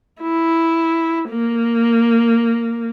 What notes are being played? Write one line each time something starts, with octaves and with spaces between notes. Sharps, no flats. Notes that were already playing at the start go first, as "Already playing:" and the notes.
E4
A#3